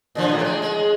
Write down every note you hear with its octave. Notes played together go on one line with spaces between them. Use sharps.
A#2 D3 F3
A2 C#3
G#3
G#3